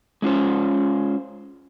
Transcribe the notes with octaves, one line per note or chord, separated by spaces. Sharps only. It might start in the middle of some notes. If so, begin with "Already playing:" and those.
G#3 C#4 F4 C5